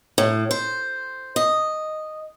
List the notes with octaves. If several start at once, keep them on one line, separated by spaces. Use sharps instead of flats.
A2
C5
D#5